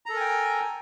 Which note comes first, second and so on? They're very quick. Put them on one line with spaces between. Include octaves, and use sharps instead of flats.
A#5 A4 A#4 G#5 G5